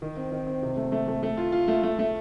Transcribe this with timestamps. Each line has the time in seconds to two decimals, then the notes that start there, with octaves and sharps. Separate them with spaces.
0.02 D#3
0.17 C4
0.32 D#3
0.47 C4
0.63 C3
0.77 A3
0.92 A3
1.08 A3
1.23 A3
1.37 F4
1.52 F4
1.68 A3
1.83 A3
1.99 A3